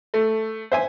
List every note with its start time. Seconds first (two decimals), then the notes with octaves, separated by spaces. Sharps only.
0.14 A3
0.72 C5 E5 G#5